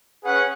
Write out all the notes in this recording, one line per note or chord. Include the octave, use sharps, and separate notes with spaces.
C#4 G#4 B4 F#5